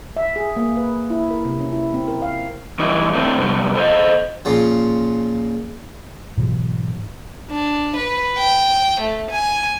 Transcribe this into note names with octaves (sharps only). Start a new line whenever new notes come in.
E5
G#4
A#3
B4
E4
A#4
C3
C#4
E4
C4
A#4
F5
G2 E3 D#4 E4
A3 C4 D4 E4
C3 G3 B3 D4
A4 C5 D#5
A#2 C#3 F3
G#2 B2 E3 F#3
D4
B4
G5
A3
G#5